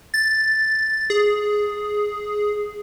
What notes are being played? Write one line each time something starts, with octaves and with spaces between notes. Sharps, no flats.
A6
G#4